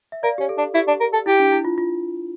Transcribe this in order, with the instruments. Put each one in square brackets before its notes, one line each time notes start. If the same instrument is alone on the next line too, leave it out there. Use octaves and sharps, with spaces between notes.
[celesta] E5
[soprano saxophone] A#4 [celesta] D5 F5
[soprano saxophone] C#4 [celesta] G4
[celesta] A4
[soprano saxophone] D4
[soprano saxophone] E4 [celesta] G4
[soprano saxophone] D4
A#4
A4
[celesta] E4 [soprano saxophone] G4
[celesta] D4
E4
F4
F4